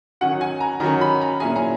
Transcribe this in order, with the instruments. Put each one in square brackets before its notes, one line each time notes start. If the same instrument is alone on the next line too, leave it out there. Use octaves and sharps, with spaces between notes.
[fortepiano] D#3 F#3 C#4 F#4 [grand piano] F#5
[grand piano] G#5
A#5
[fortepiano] D#3 F#3 C#4 F#4 [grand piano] A#5
[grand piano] B5
A#5
[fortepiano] A#2 F#3 C#4 E4 G#4 [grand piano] G#5
[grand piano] A#5